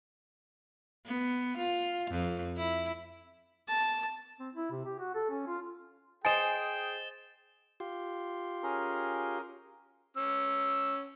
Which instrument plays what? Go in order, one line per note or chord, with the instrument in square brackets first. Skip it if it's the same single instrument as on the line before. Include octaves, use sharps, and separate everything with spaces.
[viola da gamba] B3
F4
F2
E4
[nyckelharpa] A5
[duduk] C4
E4
C3
G4
F#4
A4
C#4
F4
[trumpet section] G#4 G5 [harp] C5 D#5 [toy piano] G#5 [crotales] A6 E7 G7
[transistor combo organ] F4 G4 C6
[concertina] C#4 G#4 A#4
[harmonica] C#4 E6